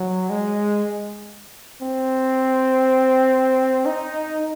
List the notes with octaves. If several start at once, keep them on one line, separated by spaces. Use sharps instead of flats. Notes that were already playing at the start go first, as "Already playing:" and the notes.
Already playing: F#3
G#3
C4
D#4